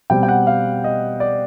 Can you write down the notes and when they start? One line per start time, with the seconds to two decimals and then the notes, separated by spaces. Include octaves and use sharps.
0.10 B2 G3 C4 G5
0.23 G5
0.29 F#5
0.47 F5
0.84 D#5
1.20 D5